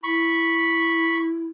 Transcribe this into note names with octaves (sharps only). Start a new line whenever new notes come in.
E4 B5 C#6